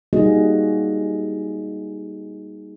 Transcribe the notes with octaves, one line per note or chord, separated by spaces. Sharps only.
G3 A#3 D#4 F#4 G#4 D#5